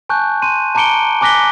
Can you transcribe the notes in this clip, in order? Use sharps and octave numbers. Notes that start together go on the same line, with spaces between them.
G#5 A5 C#6 F#6 G6
C6 D#7
A5 A#5 D6 C#7 D7 G7
G#5 D6 F#6 A#6 B6 G7